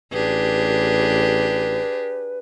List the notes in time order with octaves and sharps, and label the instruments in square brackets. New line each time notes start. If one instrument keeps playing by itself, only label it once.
[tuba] A1 [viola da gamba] D4 G4 G#4 [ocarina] B4